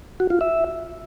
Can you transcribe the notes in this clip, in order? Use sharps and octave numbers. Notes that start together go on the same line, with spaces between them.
F#4
F4
E5